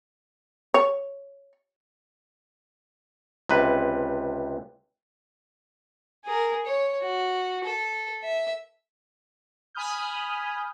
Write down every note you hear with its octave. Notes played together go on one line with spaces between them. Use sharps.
C#5
C#2 C3 B4
G#4 A#4
C#5
F#4
A4
E5
G#5 B5 D#6 F6 G6